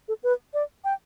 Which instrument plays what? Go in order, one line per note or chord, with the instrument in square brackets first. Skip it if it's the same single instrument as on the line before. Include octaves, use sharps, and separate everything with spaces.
[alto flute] A4
B4
D5
G5